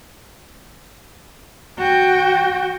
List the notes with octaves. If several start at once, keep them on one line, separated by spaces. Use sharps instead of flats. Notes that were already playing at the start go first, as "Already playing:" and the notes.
F#4 G5